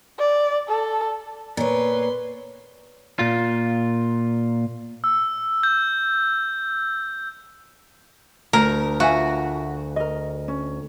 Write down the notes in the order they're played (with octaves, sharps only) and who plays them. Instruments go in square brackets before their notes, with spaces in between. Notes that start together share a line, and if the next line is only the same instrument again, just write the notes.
[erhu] D5
A4
[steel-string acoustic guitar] A#2 C#5 [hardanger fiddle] B4 C6
[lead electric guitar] A#2 F4
[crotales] E6
G6
[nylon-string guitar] D2 [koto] A#4
[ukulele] F4 E5 G#5 [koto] F#4
[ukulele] A#4 D#5
C#4